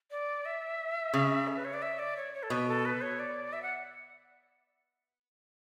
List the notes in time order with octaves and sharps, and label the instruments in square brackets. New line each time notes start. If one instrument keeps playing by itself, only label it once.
[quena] D5
E5
[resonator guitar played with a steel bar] C#3
[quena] A4
B4
C#5
D5
E5
D5
C#5
C#5
A4
[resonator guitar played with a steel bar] B2 [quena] B4
[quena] A4
B4
C#5
D5
E5
F#5